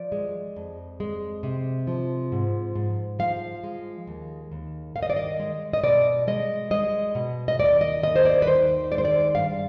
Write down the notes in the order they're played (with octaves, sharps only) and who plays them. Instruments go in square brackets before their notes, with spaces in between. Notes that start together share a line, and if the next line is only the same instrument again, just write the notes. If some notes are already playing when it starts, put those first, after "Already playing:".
Already playing: [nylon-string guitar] F3 D5
G#3
F2
G#3
C3
F3
G#2
G#2
F3 F5
G#3
D#2
D#2
D#3 F5
D#5
D5
D#5
G#3
D#5
B2 D5
G#3 D#5
G#3 D#5
B2
D#5
D#2 D5
D#5
D#2 D#5
C5
D5
B4
D#3 C5
G#3 D5
C5
D5
G2 F5